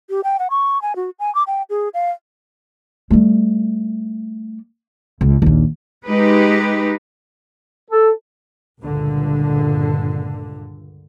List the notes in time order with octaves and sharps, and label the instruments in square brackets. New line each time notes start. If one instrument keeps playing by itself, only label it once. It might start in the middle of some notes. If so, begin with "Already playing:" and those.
[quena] G4
G5
F#5
C#6
G#5
F#4
G#5
D6
G5
G#4
F5
[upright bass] G3 A3
C#2
A#1 D#2
[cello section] G#3 D#4 G4 B4
[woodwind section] A4
[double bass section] C#2 G2 A#2 D3